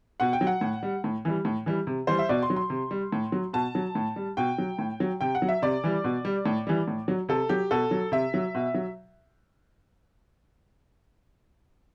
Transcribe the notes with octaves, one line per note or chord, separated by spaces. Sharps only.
B2 F#5
G5
F#3
F#5
A2
G3
A2
E3 G3
A2
E3 G3
C3
E3 G3 C5
E5
B2 D5
C6
F#3
C6
C3
G3
A2
F#3
B2 A5
F#3
A2
G3
B2 G5
F#3
A2
F#3
C3 G5
F#5
F#3
E5
C3 D5
E3 G3
B2
G3
A2
E3 G3
A2
F#3
C3 A4
F#3 G4
B2 A4
F#3
C3 E5
F#3
B2
F#3